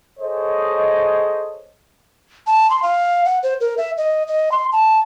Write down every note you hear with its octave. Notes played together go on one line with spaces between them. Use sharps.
G#4 A4 C5 C#5 D#5
A5
C6
F5
F#5
C5
A#4
E5
D#5
D#5
C6
A5